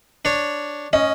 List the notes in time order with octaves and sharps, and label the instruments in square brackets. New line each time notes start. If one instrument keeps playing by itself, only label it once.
[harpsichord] D4 C#5
[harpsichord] C#4 [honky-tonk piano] D#5